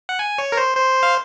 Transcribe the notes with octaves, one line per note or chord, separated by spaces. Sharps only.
F#5
G#5
C#5
A#4
C5
C5
F5